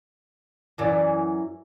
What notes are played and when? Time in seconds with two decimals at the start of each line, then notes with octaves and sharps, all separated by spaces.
0.78 F#2 E3 D5